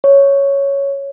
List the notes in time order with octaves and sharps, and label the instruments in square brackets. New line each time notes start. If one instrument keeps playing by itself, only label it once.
[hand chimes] C#5